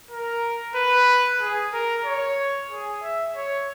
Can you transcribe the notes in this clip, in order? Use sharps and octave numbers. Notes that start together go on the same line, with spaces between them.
A#4
B4
G#4
A#4
C#5
G#4
E5
C#5